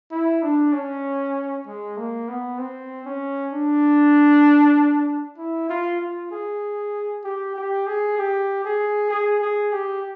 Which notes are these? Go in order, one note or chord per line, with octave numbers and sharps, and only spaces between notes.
E4
D4
C#4
G#3
A#3
B3
C4
C#4
D4
E4
F4
F4
G#4
G4
G4
G#4
G4
G#4
G#4
G#4
G4